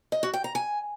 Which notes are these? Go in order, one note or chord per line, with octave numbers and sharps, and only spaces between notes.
D#5
F#4
G5
A#5
G#5